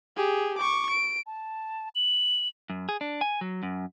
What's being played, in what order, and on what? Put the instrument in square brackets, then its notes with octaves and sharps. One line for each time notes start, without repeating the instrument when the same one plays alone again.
[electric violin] G4 G#4
C#6 D6
D7
[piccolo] A5
F#7
[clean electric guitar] F#2
G#4
D4
G#5
F#3
F#2